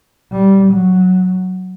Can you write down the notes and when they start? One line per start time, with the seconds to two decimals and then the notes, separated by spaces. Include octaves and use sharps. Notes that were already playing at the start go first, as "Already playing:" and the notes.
0.32 G3
0.72 F#3